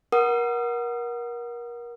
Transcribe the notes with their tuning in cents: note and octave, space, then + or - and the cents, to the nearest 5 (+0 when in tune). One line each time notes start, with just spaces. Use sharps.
A#4 +30 F#5 +0 D#6 -10